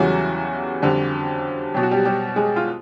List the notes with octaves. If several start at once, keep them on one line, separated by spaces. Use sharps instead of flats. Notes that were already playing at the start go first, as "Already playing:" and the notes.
Already playing: E2 C#3 E3 F#3 G3 F#4
F2 D3 G3
B2 F#3 G4
F#4
G3 G4
G3 G4
G#3 G#4
F4